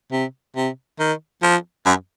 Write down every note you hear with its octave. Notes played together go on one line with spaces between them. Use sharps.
C3
C3
D#3
F3
F#2